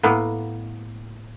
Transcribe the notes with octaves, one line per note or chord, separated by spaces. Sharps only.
A2 A#3 B3